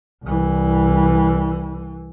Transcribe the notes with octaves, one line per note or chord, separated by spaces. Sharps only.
C2 E3